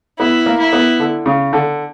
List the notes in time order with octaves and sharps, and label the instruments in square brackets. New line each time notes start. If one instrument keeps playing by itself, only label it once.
[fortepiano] B3 [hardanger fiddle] E4
[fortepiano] A#3
[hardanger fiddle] E4
[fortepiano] B3
D3
C#3
D3